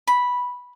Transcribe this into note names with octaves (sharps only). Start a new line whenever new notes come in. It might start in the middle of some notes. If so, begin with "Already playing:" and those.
B5